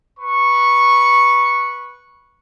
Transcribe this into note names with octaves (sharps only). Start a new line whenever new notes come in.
B4 C#6